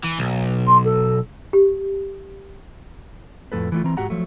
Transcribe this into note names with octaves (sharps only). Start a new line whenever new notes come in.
E3
B1
C6
A4
G4
F2 A2 F3 B3 A4 B4
E3 A3 F4
E3 C4 A#5
G#2 F#4 G4 F#5 A#5
F3 F#3 A3